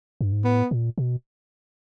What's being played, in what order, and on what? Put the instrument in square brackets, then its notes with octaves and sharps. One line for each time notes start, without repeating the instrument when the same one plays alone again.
[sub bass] G2
G#2
[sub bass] A2 [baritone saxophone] B3
[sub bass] A#2
B2